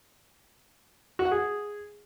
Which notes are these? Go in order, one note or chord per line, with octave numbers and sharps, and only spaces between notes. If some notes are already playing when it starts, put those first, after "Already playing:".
F#4
F#5
G#4